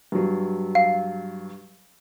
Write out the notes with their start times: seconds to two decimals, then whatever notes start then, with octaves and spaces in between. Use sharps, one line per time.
0.12 G2 F#3
0.75 F5